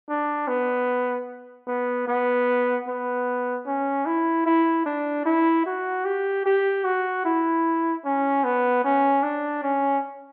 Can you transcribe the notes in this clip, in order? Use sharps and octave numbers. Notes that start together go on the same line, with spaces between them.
D4
B3
B3
B3
B3
C#4
E4
E4
D4
E4
F#4
G4
G4
F#4
E4
C#4
B3
C#4
D4
C#4